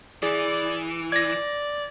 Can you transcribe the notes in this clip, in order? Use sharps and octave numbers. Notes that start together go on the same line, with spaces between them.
E3 G#4 D5
D5 G#6 A#6